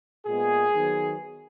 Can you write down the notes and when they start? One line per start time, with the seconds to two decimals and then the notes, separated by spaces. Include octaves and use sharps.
0.26 A#2 G#3 B3 G#4
0.75 D#3 F#3 B3